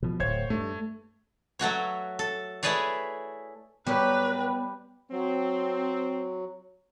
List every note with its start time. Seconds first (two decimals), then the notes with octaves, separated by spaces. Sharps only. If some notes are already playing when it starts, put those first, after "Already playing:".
0.03 B2 F3
0.20 D1 C5 C#5 G#6
0.50 G2 A3
1.59 F#3 A3 F#4 C#5
2.19 A4
2.63 A3 E4 G#4 B4 C#5 D5
3.87 A2 F#3 G3 B3 B4 C#5
5.11 F#3 C4